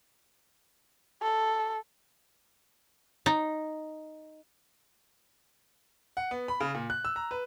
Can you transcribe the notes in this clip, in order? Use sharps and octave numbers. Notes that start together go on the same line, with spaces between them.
A4
D#4
F#5
B3
B5
C#3
A#2
F#6
E6
A#5
B4